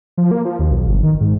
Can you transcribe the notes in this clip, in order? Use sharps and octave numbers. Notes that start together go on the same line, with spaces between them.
F3
A#3
F3
D#2
B1
G1
D#3
G#2